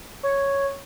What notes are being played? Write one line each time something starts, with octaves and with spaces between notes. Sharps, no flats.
C#5